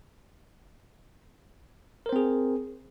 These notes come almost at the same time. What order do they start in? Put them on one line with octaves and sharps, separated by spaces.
A#4 C5 C4 G#4